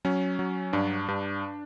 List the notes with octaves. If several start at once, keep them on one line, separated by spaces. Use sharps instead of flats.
F#3 C#4
F#3
G2 D4
G2